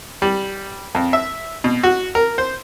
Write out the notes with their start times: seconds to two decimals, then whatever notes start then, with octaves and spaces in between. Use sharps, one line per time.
0.22 G3
0.95 F2
1.13 E5
1.64 B2
1.83 F#4
2.15 A#4
2.38 C5